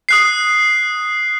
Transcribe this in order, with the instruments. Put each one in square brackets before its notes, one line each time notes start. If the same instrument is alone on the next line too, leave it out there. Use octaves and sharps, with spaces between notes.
[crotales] D#6 F#6 C7